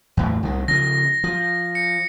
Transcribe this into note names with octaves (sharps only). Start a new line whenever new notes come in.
E2 A2
C2 D#3
C#3 F3 A#6
F3
C#7